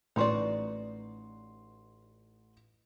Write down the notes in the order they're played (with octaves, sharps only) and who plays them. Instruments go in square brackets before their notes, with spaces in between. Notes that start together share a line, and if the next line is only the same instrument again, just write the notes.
[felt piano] A1 B4 C6 [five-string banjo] D#4 F#4 D5